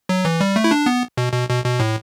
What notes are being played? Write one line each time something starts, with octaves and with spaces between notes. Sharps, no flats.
F#3
E3
G3
A3
E4
D4
B3
B2
B2
B2
B2
A2